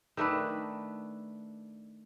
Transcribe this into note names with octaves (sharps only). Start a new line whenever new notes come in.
D#3 A3 D4 B4